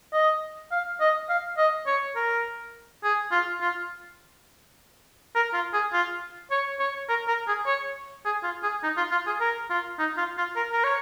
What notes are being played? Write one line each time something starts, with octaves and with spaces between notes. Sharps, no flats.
D#5
F5
D#5
F5
D#5
C#5
A#4
G#4
F4
F4
A#4
F4
G#4
F4
C#5
C#5
A#4
A#4
G#4
C#5
G#4
F4
G#4
D#4
F4
F4
G#4
A#4
F4
D#4
F4
F4
A#4
A#4
C#5